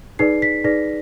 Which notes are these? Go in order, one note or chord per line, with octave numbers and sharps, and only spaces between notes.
D#4 G#4 B4 D5 C7
B6
D#4 G#4 B4 D5 A#6